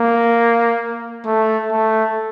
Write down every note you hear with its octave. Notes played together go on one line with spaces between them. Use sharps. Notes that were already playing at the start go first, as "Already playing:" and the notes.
Already playing: A#3
A3
A3